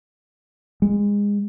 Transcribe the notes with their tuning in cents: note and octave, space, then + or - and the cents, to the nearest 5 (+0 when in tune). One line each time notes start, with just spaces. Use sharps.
G#3 -25